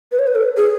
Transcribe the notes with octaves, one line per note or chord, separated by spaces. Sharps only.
B4
C#5
B4
A4
G#4